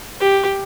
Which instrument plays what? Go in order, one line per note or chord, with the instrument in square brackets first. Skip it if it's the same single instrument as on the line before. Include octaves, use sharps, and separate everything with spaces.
[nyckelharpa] G4